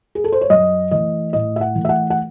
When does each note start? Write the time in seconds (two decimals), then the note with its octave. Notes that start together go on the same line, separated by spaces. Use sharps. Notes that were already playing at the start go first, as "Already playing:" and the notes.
0.15 G#4
0.24 A4
0.32 C5
0.41 C#5
0.50 F#2 D#5
0.91 E3 A3 D#5
1.33 A2 D#5
1.56 E5
1.61 F#5
1.75 E3 A3
1.85 E5
1.89 F#5
2.10 F#5